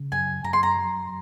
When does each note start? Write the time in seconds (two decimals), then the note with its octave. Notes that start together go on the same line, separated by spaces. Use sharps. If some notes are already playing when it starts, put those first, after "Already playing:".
Already playing: C#3
0.12 F#2 G#5
0.44 F#2 A#5
0.53 C6
0.63 A#5
0.76 F#3